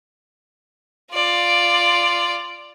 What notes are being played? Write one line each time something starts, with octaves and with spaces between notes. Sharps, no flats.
F4 D5